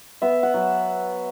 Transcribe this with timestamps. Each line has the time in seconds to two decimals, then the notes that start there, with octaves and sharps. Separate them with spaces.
0.22 B3 E5
0.43 F#5
0.54 F#3